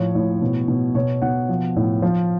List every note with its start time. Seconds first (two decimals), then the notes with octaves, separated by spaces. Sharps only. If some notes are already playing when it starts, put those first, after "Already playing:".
Already playing: A2 F3 C#5
0.15 A2
0.42 B2
0.68 B2
0.95 B2 C#5
1.22 B2 F#5
1.49 F3
1.76 A2
2.02 F3